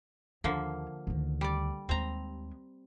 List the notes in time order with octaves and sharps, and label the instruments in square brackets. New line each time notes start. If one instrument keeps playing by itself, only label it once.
[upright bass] D#2 [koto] D3 F3 A#3
[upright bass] D2 D#3
[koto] G3 D5
[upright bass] D#2 G#3 [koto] C4 A#5